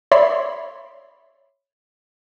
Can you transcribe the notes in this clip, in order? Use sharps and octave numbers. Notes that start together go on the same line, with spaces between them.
C#5 D5 E5 B5 C6